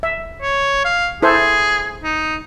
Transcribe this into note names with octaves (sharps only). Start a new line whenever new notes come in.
E5
C#5
F5
E4 G#4 A4 C5
D#4